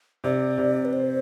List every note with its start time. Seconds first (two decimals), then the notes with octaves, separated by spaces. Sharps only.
0.24 C3 D5
0.58 C3
0.85 B4
0.93 C5